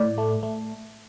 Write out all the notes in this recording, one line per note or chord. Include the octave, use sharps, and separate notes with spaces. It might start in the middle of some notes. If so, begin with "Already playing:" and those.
Already playing: A2 D5
A3
A3